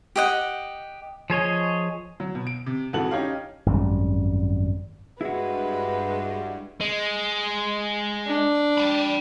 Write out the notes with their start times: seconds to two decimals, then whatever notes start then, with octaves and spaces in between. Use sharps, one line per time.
0.16 G4 D#5 F#5
1.30 F3 G#4 C#5 D#5
2.20 F#3
2.35 B2
2.47 D7
2.66 C3
2.93 F2 G#2 E3 F#4 A4 F#7
3.11 C#4 D#4 G4 C#5 F5
3.66 G#1 F#2 G3
5.21 G2 G#3 E4 F#4 B4
6.81 G#3
8.27 D4
8.78 G5 B5